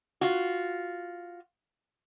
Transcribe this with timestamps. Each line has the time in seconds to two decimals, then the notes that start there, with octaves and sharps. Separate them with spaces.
0.21 F4 F#4